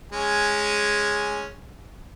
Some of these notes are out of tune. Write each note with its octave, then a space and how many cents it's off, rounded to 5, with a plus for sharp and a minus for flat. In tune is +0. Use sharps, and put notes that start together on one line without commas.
G#3 +0 C#4 +0 G#5 +0